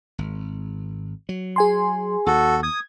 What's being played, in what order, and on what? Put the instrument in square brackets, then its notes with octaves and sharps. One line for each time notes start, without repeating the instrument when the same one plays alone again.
[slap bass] G#1
F#3
[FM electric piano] G#4 G#5 C6
[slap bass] D#2 [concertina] F#4 A4
[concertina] D#6 [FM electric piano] G#6